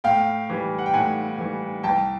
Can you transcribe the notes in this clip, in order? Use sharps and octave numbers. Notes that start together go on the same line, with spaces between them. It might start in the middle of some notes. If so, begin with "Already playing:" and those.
A2 F5 G5
E3 G3
F#5
G5
A2 F#5 G#5
E3 G3
C2 G5 A5